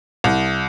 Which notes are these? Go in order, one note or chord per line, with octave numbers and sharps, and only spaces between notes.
C2